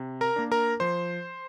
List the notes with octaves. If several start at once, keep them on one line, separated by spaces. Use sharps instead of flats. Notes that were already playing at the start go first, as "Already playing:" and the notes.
Already playing: C3
A#4 A#5
A#3 D4
A#4 A#5
F3 C5 C6